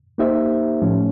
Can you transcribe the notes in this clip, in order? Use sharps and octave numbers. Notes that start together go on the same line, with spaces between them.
A#3 D#4 G4 C5 E5
A2 F3 A3 C#4